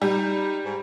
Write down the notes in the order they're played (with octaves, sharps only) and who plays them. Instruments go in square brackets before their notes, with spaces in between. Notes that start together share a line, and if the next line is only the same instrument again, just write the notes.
[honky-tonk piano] G3 [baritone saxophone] D#4
[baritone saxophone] G#2